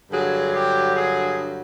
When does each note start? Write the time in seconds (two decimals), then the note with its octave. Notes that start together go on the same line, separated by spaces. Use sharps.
0.11 G2 D3 F#3 G#4
0.54 G4
0.96 G#4